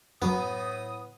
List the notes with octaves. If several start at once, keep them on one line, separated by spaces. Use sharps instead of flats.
F#2 A2 F#3 B3 D#6